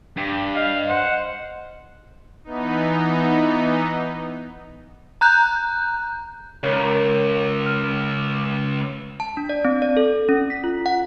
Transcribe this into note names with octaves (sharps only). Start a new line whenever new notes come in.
G2 G4
D#5 F5
C5 F#5
E3 B3 D#4
A#5 F#6 G6
C#2 D#3 C#5
F6
A5
D4
D5
C4
D5
A4
C#4
B6
F4
F#5